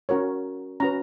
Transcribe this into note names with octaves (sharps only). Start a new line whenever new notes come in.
C#4 F#4 A#4 C#5
C#4 F#4 B4 A#5